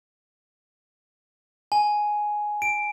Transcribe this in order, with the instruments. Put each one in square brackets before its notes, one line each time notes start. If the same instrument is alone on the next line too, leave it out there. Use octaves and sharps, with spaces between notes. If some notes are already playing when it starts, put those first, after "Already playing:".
[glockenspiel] G#5
D7